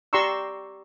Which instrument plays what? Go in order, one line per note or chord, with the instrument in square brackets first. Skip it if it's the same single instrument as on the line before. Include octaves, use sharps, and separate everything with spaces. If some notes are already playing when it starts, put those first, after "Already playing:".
[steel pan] G4 D5 A#5 C6 C#6 E6